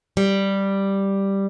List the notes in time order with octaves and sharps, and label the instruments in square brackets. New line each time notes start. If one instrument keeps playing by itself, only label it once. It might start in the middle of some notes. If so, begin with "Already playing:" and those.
[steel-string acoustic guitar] G3